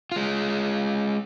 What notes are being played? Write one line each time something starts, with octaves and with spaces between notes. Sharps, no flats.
G#3 F4